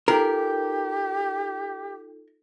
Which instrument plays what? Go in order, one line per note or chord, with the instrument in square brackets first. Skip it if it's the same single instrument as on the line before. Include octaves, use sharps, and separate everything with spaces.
[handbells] D#4 F4 A4 [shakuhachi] G4 [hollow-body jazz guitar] A#4